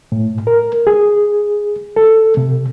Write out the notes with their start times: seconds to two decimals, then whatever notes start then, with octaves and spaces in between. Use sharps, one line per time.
0.12 A2
0.47 A#4
0.87 G#4
1.96 A4
2.37 C3